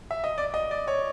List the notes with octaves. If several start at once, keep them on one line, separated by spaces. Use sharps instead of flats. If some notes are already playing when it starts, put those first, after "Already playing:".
E5
D#5
D5
D#5
D5
C#5